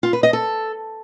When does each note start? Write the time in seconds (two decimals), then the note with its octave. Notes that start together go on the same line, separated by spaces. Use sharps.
0.03 F4
0.13 B4
0.23 D#5
0.33 A4